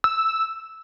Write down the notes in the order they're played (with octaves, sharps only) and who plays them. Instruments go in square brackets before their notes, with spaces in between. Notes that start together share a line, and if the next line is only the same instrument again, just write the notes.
[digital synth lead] E6